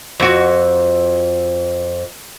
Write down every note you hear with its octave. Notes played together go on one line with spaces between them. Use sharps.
F2 F#4